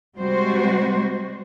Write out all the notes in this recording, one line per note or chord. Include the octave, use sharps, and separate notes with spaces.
C3 G3 G#3 F#4 C5